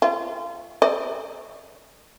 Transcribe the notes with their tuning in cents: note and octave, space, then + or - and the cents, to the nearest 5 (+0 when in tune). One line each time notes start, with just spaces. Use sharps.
F4 -35
D5 +40